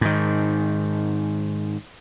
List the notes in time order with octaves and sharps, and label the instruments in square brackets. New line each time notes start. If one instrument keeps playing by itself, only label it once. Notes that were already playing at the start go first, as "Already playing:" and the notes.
[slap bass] G#2 D#3